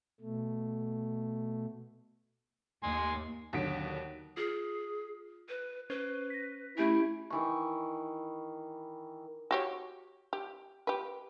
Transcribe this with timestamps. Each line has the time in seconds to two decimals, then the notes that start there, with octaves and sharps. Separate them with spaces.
0.21 B2 A3
2.83 D#2 G#5 C6
3.53 D#2 B2 D3 F#3 B6 D7
4.37 F4 G#4
5.49 B4
5.90 C#4 B4 C5
6.30 A#6 B6
6.78 A3 C#4 E4 G4 G#5
7.30 D#3 E3 C#6
9.51 F#4 G4 C#5
10.33 G4
10.87 G4 B4